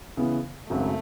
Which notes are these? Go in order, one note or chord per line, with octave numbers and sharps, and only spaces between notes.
C#3 E3 B3
G#1 F#2 C#3 F#3 A3